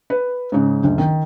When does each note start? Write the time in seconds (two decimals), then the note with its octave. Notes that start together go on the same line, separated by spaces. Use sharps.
0.10 B4
0.52 G#2 C#3
0.84 F#1 D2
0.98 D#3